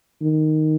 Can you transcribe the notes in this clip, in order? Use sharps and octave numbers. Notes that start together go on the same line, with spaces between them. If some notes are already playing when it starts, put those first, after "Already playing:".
D#3